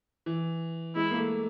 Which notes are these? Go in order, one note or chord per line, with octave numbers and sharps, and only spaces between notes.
E3
G#3 E4
A#3
A3